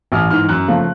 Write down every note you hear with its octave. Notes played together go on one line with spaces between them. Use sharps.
A1 F6
G#2 E3 F6
F#2 F#6
C#3 F3 A3